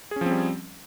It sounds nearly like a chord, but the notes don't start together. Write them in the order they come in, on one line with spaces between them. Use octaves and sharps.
G#4 C#4 F3 C4 G3